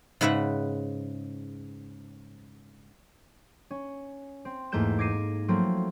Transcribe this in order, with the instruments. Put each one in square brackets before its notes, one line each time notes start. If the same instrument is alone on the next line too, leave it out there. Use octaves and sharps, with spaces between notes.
[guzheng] G#2 C#3 B4 E5 F#5
[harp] C#4
C4
E2 G#2 A3 A#3 G6 E7
D6 G#6 A#6 C7 D#7
F3 F#3 A3 A#3 C4